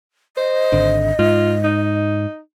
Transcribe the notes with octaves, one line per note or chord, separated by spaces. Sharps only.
C5 D#5
G#1 D3
G#2 F4
D#4